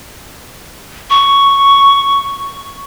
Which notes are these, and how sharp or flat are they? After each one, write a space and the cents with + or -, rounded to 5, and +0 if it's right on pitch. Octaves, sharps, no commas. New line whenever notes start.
C#6 +5